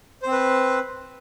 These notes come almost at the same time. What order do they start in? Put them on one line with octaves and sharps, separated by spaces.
C5 C4 B4